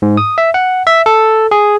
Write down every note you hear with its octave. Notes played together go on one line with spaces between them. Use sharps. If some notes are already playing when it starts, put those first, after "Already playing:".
G#2
D#6
E5
F#5
E5
A4
G#4